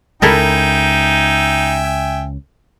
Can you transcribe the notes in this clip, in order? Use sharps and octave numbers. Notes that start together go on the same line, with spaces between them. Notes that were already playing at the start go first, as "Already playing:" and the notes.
C#2 D#4 E4 A4 A#4 E5 G5 G#5